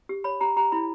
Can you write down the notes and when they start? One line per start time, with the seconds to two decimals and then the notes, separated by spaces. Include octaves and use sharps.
0.09 G4
0.24 C#5 B5
0.41 G4 A#5
0.57 G4 A#5
0.72 E4 B5